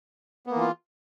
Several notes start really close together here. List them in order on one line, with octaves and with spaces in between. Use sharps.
B3 A#3 E3 F4